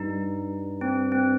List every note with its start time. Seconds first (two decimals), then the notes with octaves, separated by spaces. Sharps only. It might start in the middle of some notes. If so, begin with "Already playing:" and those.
Already playing: G2 D#4
0.81 C4
1.12 C4